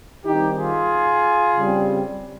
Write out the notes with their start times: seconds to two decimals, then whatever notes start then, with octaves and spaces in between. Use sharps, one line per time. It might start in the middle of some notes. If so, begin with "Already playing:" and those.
0.25 D#3 G3 C4 D#4 G4
0.58 F4 G#4
1.56 C#3 G3 C4